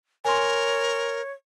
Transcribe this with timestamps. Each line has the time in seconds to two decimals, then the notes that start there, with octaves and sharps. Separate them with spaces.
0.25 A#4 C#5 G#5 C6